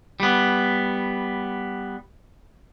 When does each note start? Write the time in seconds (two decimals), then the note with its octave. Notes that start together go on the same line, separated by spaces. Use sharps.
0.20 G3 B3